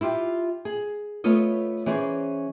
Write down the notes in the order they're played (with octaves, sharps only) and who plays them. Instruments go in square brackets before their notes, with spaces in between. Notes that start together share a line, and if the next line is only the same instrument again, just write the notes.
[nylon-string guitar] E4 F4 G4 E5
G#4
A3 B3 F4 C#5 D#5
E3 C#4 G#4 C5 D5